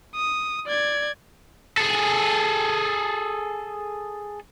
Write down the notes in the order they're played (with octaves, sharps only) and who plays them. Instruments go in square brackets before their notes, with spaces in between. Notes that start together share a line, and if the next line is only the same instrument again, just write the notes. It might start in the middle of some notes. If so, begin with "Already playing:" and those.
[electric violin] D#6
D5 G#6
[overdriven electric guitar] G#4 A4